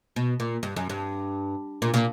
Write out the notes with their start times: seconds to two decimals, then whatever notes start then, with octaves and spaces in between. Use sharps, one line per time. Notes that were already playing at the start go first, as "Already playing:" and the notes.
0.16 B2
0.40 A#2
0.63 G2
0.76 F#2
0.90 G2
1.82 A#2
1.94 A#2